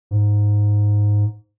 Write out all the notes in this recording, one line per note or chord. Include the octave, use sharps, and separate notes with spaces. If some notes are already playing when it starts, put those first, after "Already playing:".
G#2